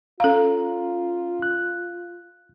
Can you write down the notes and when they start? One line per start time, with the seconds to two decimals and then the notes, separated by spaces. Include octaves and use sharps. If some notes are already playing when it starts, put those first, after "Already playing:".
0.20 C#4 F4 A4 F5 A#5
1.42 F#6